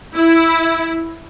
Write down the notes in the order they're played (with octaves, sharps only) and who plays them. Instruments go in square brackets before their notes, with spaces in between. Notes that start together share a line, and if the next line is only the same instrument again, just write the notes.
[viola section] E4